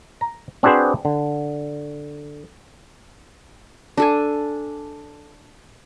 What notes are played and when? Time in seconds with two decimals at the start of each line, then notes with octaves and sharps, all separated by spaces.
0.21 A#5
0.63 C4 D4 F#4 G#4 B4 C5
1.05 D3
3.97 D4 A4 G#5